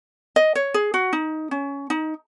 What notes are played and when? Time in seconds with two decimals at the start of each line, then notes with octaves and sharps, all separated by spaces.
0.36 D#5
0.55 C#5
0.74 G#4
0.94 F#4
1.13 D#4
1.51 C#4
1.90 D#4